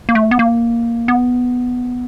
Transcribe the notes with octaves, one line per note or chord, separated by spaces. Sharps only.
A#3
A3
B3
A#3
B3